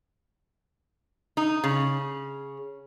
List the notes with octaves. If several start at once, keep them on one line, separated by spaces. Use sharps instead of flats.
D#4
C#3